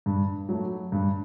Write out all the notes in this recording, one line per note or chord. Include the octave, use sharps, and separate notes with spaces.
G2
F#3 A3
G2